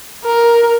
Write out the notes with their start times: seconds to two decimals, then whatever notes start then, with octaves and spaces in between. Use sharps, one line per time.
0.25 A#4